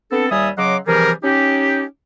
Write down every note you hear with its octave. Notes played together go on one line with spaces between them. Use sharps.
B3 C4 D4 A4
D#2 G3 E5 G#5 D#6
C#3 F#3 D#5 F#5 C6 D6
C3 E3 F3 G3 G#4 A#4
C#4 D#4 G4